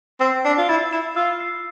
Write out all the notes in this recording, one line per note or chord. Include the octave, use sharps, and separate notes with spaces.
C4 E6
D4 C7
F4
E4 A6
E4 E7
F4 E6
C7